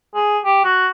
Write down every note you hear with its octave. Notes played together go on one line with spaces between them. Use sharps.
G#4
G4
F#4